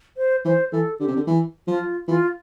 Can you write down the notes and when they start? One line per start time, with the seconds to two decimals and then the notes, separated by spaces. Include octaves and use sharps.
0.17 C5
0.45 E3 C5
0.72 E3 A4
0.99 D3 G4
1.08 C3
1.16 D3
1.27 E3
1.68 F3 F4
2.08 E3 F4